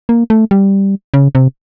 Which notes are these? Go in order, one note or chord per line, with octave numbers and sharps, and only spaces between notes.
A#3
A3
G3
C#3
C3